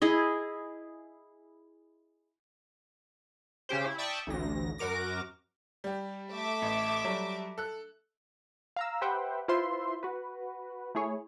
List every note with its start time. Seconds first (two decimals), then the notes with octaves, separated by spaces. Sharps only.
0.02 E4 G#4 D#5
3.69 C#3 C#4 G4 C5
3.86 E4
3.98 D5 E5 G5 A5 C#6 D#6
4.27 A1 D2 A#6
4.78 F#2 F#4 A#4 D6 A#6
5.84 G3 G4
6.30 A3 E5 D6
6.62 A1
7.04 F#3 G3
7.58 A4 F#6
8.76 F5 A#5 E6
9.01 G4 B4 C5 E5 F#5 G5
9.48 E4 F4 B4 C5 E5 C6
10.03 F#4 B4
10.95 A3 E4 G#4 C#5